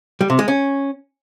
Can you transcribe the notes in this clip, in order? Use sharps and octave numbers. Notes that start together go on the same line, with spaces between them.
G3
C3
G#3
C#4